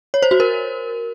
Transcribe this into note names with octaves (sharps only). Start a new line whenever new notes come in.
C#5
C5
F#4
A#4